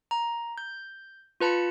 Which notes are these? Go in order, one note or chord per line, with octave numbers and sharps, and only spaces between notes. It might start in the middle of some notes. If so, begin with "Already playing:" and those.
A#5
G6
F4 B4 A5 B5 C#7